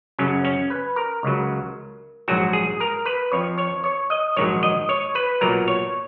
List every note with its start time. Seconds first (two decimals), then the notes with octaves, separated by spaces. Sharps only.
0.19 F#2 C#3 F#3 C#4
0.45 C#4
0.70 B4
0.96 A#4
1.23 C#2 C#3 F#3
2.28 A#1 G#2 F#3 F#4
2.53 G#4
2.80 A#4
3.06 B4
3.31 F2 F3 C#5
3.58 C#5
3.84 C#5
4.10 D#5
4.36 A#1 G#2 D#3 F#3 C#5
4.63 D#5
4.89 C#5
5.15 B4
5.41 B1 A#2 F#3 A#4
5.68 C#5